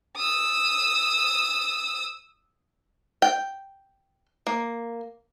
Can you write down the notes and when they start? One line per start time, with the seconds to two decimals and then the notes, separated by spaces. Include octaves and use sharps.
0.17 D#6 E6
3.22 G5
4.47 A#3